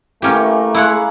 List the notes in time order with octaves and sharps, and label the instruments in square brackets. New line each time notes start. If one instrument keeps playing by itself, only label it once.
[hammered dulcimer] E3 A#3 A#4 [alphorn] A3 [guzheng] C#4 G4
[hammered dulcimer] G#3 F5 [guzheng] E4 C#5 F#5